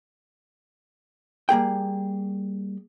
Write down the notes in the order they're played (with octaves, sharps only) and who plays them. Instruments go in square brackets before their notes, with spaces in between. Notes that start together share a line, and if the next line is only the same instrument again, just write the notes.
[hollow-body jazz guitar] G3 A#3 G#4 G5